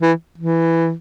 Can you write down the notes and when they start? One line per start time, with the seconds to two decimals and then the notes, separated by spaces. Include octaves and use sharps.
0.02 E3
0.38 E3